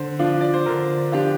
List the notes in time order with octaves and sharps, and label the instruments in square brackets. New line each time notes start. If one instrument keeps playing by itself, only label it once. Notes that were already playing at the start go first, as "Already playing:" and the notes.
Already playing: [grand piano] D3 C5
F3 D4 F4
D5
C5
D3 A#4
F3 D4 F4 G4